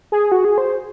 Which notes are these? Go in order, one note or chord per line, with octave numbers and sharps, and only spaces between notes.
G#4
F#4
G#4
C5